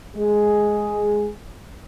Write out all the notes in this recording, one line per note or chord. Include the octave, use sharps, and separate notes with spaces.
G#3 G#4